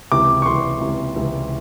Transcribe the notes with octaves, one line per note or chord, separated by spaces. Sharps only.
C#2 C3 E3 D6
C#6
C#2 C3 E3 C6
C#2 C3 E3
C#2 C3 E3